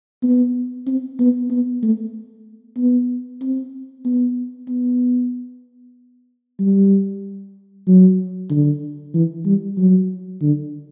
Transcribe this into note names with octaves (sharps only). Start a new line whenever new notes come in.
B3
C4
B3
B3
A3
B3
C4
B3
B3
G3
F#3
D3
E3
G3
F#3
D3